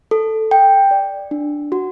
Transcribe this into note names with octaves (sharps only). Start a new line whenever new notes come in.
A4
G5
D5
D4
F#4